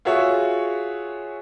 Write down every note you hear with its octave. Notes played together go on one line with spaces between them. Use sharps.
F4 F#4 G#4 C#5 E5